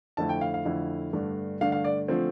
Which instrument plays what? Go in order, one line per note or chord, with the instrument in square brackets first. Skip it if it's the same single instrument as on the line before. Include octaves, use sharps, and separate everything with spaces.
[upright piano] F2 D3 A3 E4 A5
G5
F5
F5
F2 D3 A3 E4
G2 D3 A3 D4
G2 D3 A3 D4 F5
F5
D5
D3 F3 A3 C4